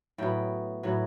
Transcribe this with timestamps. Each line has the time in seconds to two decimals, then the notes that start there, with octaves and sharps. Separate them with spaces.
0.18 A2 F#3 B3 G5
0.83 A2 F#3 B3